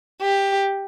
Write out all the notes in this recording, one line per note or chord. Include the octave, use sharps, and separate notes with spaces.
G4